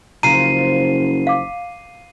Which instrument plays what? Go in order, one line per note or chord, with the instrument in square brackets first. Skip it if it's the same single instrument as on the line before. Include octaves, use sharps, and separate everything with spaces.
[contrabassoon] F#1 [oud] C#3 F3 [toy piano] A#5 [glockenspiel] C7 D#7
[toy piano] F5 D6